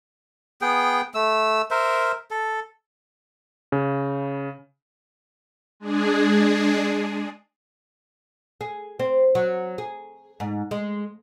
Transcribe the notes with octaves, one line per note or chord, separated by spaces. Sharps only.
B3 G#4 G5
A3 E6
A#4 C5 E5
A4
C#3
G#3 D4 G#4
G#4
C4
F#3
G#4
G#2
G#3